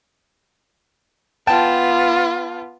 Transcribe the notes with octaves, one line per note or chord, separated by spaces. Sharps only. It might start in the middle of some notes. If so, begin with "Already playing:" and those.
B3 F4 G5 A5